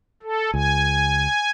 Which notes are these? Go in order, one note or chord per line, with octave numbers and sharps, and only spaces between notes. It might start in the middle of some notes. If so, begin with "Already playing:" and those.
A4
C#2 G#5